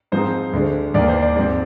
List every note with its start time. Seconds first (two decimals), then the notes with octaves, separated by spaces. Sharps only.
0.12 G#2 F3 G#3 C4 D#4 C5
0.53 D2 D3 G#3 D4
0.94 D#2 D#3 A#3 D5
1.08 C5
1.22 D5
1.35 G#2 F3 C4 D5